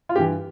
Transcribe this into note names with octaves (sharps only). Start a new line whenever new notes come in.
F4
G2 E3 G4